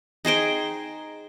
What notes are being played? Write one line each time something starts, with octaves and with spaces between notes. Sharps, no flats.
D#4 G#4 C5 G5